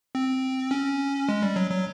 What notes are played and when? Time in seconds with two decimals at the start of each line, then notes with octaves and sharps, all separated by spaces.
0.15 C4
0.71 C#4
1.29 G#3
1.42 G3
1.56 F#3
1.70 F#3